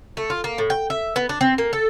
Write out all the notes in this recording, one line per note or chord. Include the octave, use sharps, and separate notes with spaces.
A3
F4
A#3
A2
G5
E5
B3
D4
C4
A#3
A4